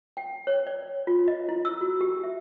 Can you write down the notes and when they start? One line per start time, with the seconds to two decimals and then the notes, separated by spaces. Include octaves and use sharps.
0.17 G5
0.47 C#5
0.67 D5
1.07 F4
1.28 D#5
1.49 E4
1.65 E6
1.81 F#4
2.01 G4
2.24 E5